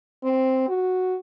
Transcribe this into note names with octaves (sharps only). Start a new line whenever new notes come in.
C4
F#4